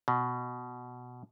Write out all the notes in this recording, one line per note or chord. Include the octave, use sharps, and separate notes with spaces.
B2